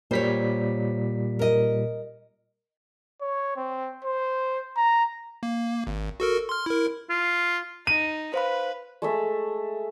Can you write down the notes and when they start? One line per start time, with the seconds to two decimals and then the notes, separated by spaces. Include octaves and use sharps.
0.11 A#2 G3 C5 C#5 B6
1.39 A#4 D#5
3.21 C#5
3.56 C4
4.04 C5
4.77 A#5
5.43 A#3
5.87 G#1
6.20 F#4 A4 A#4
6.49 C6 F6
6.66 E4 A#4
7.10 F4
7.87 D#4 D#7
8.34 B4 C5 F5 B5
9.02 G#3 A3 E5